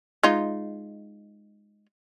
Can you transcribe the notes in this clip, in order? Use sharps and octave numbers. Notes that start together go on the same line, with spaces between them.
G#3 D#4 F4